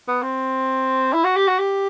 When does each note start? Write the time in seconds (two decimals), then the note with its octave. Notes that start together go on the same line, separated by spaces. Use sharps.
0.08 B3
0.23 C4
1.13 E4
1.24 F#4
1.37 G4
1.48 F#4
1.59 G4